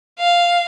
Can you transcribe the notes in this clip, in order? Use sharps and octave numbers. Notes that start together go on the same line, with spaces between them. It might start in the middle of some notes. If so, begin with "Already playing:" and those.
F5